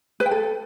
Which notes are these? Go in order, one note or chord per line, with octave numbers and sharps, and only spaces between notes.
B4
G5
A4